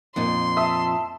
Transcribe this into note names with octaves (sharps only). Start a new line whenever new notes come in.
F2 A#2 D#4 C6
E5 A5 D#6 E6